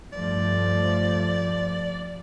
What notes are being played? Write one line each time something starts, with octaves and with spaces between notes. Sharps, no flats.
G2 F3 A3 D5